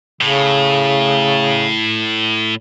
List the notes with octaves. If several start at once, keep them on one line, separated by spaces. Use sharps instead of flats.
A2 C#3